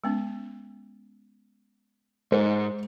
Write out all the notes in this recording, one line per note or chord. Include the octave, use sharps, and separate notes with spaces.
G#3 B3 C#4
G#2 G#3 C5